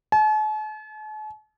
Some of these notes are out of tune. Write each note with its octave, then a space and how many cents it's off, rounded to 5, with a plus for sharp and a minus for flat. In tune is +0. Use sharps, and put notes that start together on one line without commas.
A5 -45